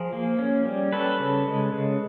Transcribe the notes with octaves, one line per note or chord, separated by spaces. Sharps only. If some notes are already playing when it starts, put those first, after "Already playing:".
Already playing: F3 G#4 A#4
A#3
C#4
G3
C#4 A4 B4
C#3
G#3
C#3